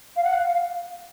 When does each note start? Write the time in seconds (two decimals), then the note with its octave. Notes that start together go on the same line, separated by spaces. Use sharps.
0.16 F5
0.24 F#5
0.32 F5
0.47 F5